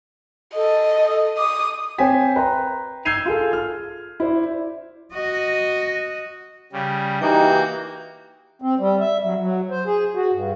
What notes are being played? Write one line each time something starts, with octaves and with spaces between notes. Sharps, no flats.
A4 D#5
D6 D#6
C4 C5 C#5 G5 G#5 B6
B4 G5 A#5 C6
E6 G6 G#6 C7 D#7 F7
F4 G#4 A4
F6
E4 C5 D5
F#4 D#5
C#3 G3
E3 A#3 D#4 F#4 G4 G6
C4
G3
E5
F#3
F#3
C5
G#4
F#4
G2